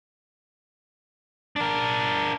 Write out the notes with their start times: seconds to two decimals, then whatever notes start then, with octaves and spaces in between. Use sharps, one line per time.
1.56 D4 A#4